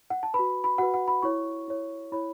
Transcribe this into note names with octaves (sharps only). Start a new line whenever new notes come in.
F#5
A5
B4 B5
F#4
B5
F#4 B4 F#5
F#5
B5
E4 C#5 C#6
E4 C#5
E4 C#5 B5